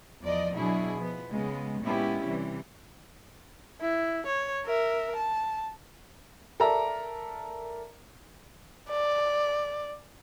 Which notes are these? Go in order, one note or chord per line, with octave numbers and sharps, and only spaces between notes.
E2 F3 D5 D#5
B2 F#3 D4 E4 G#4
F3 B3
C#3 G#3 B3
A#2 G#3 B3 C#4 E4 G4
C3 E3 G3
E4
C#5
A#4 E5
A5
A4 A#4 D5 E5 A#5
D5